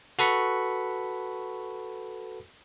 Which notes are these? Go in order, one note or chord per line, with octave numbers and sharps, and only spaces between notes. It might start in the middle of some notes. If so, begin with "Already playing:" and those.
F#4 A4 B4 B5 C#6